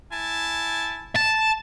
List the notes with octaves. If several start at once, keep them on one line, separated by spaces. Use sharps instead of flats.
E4 G#5 A5
A5